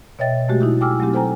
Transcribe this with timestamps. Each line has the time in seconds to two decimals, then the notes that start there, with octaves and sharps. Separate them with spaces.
0.19 B2 C#5 D#5 E5 G5 A6
0.48 B2 F#3 G#3 A3 F#4 G4
0.61 D#4 E4 G4
0.80 G#4 G5 G#5 D6 E6 F6
1.00 F#3 A3 C4 G4
1.13 A4 C5 G5 G#5 A#5